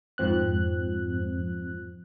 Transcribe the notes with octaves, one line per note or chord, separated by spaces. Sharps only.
F2 G#2 F3 C4 F#6